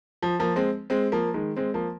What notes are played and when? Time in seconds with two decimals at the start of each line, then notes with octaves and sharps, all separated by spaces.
0.22 F3
0.40 F3 A#3
0.56 G#3 C4
0.90 G#3 C4
1.12 F3 A#3
1.34 D#3 G#3
1.57 G#3 C4
1.74 F3 A#3